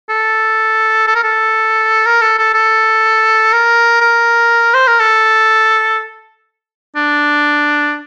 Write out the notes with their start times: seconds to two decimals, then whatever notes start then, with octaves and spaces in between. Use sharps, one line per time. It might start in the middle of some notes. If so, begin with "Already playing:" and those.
0.10 A4
1.08 A4
1.15 A#4
1.24 A4
2.06 A#4
2.21 A4
2.39 A4
2.54 A4
3.53 A#4
4.01 A#4
4.74 C5
4.88 A#4
5.00 A4
6.96 D4